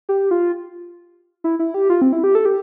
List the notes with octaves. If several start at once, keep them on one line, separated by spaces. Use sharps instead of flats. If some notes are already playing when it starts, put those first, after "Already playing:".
G4
F4
E4
E4
G4
F4
C4
E4
G4
A4
G4